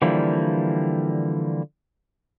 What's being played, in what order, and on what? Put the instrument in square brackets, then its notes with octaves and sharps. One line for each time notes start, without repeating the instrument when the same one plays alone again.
[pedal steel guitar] D3 E3 F3 G3 A#3